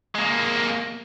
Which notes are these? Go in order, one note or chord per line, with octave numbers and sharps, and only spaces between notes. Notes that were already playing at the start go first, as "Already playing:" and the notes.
G#3 A#3